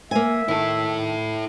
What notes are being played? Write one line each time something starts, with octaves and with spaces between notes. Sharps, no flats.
A#3 E5 G#5
D#3 E4 A4